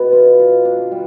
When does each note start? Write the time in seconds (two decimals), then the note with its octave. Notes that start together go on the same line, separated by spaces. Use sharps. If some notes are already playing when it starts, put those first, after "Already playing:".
Already playing: B2 B3
0.13 F4
0.39 F4
0.65 D4
0.92 G3